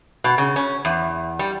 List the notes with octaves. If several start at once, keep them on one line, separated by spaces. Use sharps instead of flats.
B2
C#3
C#4
E2
G3